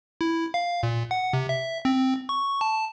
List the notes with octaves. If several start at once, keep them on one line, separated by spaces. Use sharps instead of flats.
E4
F5
A#2
F#5
C3
E5
C4
C#6
A5